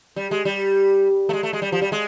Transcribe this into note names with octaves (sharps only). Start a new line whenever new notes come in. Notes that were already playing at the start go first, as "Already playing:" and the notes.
G3
G#3
G3
A3
G#3
A3
G#3
G3
F3
G3
G#3